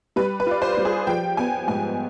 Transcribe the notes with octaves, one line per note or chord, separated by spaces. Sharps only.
G3 B4
B4
F4 D5
C5
G3
G#4
F3 G5
B3 G#5
G#2 G#5